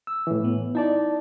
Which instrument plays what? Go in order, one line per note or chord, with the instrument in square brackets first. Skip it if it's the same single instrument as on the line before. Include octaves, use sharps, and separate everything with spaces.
[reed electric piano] E6
A2 E3
[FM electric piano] B3
[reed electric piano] D#4 D5 [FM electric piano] E4 A5